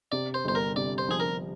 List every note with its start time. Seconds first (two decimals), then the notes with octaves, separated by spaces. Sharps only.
0.12 C3 D5
0.34 C5
0.45 G1 C5
0.55 A#4
0.76 C3 D5
0.98 C5
1.09 F3 G#4
1.20 A#4